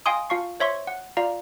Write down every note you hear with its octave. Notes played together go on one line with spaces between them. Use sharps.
D#5 F5 G5 G#5 C6 D#6
F4 F5 A5 C#6 C7
C5 C#5 E5 C6 C#6
F#5
F4 D5 F5 A#5